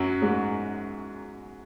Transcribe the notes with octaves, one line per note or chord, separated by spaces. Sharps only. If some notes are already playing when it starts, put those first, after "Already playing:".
Already playing: F#2 F#3
G#2 G#3